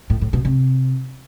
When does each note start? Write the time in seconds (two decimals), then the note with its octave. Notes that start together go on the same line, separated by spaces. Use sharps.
0.10 A2
0.21 A2
0.33 B2
0.45 C3